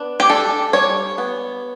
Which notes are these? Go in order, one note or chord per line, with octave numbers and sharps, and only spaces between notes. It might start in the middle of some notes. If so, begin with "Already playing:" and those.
Already playing: B3 D4
G4
D4 A4
G3 C#5
B3